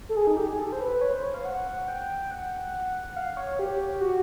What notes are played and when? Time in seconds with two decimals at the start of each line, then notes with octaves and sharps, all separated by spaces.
0.09 A4
0.16 G#4
0.27 D#4
0.37 G4
0.49 G#4
0.59 A4
0.73 C5
0.80 B4
1.01 C#5
1.13 C5
1.24 C#5
1.34 F5
1.45 F#5
1.88 G5
2.31 F#5
3.16 F5
3.37 C#5
3.59 G4
4.01 F#4